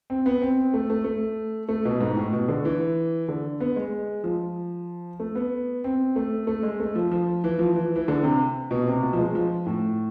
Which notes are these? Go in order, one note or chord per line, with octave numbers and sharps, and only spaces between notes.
C4
B3
C4
A3
A3
A3
A3
B2
G#2
A2
B2
D3
E3
D3
B3
G#3
F3
A3
B3
C4
A3
A3
G#3
A3
F3
F3
E3
F3
E3
E3
D3
C3
B2
C3
B2
F3
G#3
F3
A2